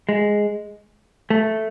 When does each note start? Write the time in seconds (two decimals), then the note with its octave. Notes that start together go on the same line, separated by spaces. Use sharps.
0.09 G#3
1.30 A3